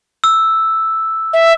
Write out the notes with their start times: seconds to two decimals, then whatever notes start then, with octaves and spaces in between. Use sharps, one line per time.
0.24 E6
1.33 E5